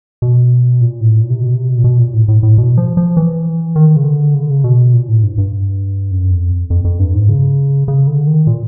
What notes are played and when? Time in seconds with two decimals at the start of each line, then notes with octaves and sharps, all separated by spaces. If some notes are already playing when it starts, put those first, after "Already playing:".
0.22 B2
0.81 A#2
1.01 A2
1.20 A#2
1.30 C3
1.40 B2
1.55 C3
1.69 B2
1.78 A#2
1.84 B2
1.99 A#2
2.13 A2
2.28 A2
2.43 A2
2.58 B2
2.77 F3
2.97 F3
3.17 E3
3.76 D#3
3.96 C#3
4.05 D3
4.34 C#3
4.42 D3
4.50 C#3
4.64 B2
4.93 A#2
5.08 A2
5.23 G2
5.38 G2
6.11 F#2
6.31 F2
6.70 F2
6.84 F2
7.00 G2
7.14 G#2
7.29 C#3
7.88 C#3
8.07 D3
8.27 D#3
8.47 A#2